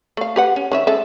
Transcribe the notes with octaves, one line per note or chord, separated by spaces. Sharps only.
A3 F5
G4 B4 F#5
C#4
D#3 C#4 E5
G#3 A4 E5